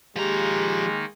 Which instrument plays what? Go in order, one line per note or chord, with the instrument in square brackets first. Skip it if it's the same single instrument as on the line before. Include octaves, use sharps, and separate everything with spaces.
[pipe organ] D#3 A#3 D#4 [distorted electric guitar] F3 A#5 [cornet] G#3 [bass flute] G4